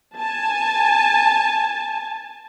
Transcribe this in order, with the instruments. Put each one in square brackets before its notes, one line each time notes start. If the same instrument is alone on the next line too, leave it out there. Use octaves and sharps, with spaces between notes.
[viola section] G#5 A5